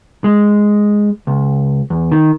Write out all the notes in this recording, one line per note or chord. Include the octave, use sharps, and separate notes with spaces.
G#3
C#2
E2
D#3